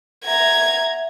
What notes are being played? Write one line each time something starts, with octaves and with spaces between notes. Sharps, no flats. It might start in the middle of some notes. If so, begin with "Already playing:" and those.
E5 F#5 A#5 G#6